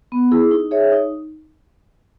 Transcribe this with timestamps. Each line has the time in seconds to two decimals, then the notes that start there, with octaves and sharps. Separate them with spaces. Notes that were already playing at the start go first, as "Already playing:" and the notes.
0.12 B3
0.31 E4 G#4
0.51 D#4
0.71 G#4 C#5 E5
0.92 D#4